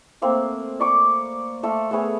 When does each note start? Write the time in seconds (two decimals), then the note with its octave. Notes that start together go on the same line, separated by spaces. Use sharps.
0.22 A3 A#3 C4
0.80 D5 C#6 D6
1.63 A3 A4 F5 C6
1.91 A3 B3 G#4 C#5